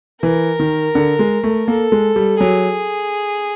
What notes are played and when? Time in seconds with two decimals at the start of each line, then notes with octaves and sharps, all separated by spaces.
0.22 E3 A#4
0.59 D#3
0.95 D3
1.19 G#3
1.43 A3
1.68 A#3 A4
1.92 G#3
2.16 G3
2.40 F#3 G#4